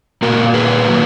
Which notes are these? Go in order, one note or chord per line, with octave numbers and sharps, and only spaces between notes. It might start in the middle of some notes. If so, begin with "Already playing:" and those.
A#2 A#3 F#4 A#4
G#4 B4
F#3 A#3